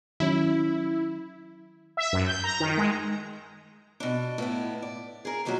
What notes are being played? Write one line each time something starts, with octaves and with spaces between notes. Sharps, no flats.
D#3 F#3 C#4 E4
E5
F#2
G6
A#5
D#3
G#3
B2 D4
A2 B3 E4
D5
G#4 A#4
A#2 D#3 F#3 G3 F#4